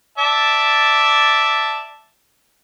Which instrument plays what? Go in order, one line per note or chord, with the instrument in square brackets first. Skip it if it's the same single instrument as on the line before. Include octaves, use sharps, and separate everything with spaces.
[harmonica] D5 E5 A5